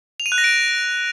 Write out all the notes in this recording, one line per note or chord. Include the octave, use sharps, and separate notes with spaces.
F7
D#7
F#6
A#6
D7